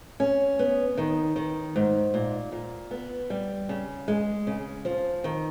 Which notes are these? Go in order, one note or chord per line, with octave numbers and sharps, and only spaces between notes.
C#4
B3
D#3
D#3
G#2
A#2
A#2
B3
G3
C#3
G#3
C#3
F3
D#3